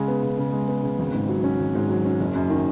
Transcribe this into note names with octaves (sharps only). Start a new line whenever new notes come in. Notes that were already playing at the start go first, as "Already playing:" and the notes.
Already playing: C#3 G#3
B3
C#3
C#3
G#3
B3
C#3
G#1
G#2
F#3
C#4
G#1
G#2
F#3
C#4
F#1
F#2
D#3